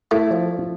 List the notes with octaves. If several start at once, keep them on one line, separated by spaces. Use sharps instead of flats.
A3 E4
F3